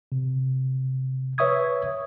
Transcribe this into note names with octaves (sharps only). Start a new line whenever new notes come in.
C3
B4 C#5 E5 C#6 D#6 G#6